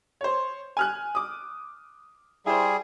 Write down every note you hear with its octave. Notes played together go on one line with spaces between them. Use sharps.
C5 C#5
G#5 F6 F#6
D6 D#6
G3 E4 G#4 C5